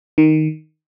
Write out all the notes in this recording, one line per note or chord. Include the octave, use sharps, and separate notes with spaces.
D#3